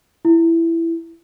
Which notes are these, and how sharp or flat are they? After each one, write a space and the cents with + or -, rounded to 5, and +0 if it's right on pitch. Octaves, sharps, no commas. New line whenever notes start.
E4 +10